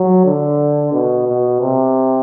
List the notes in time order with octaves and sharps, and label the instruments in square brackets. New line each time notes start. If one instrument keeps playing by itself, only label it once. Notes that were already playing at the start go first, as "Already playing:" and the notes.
Already playing: [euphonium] F#3
D3
B2
B2
C3